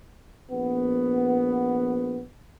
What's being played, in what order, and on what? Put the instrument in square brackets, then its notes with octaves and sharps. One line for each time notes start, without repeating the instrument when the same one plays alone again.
[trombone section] A#1 B3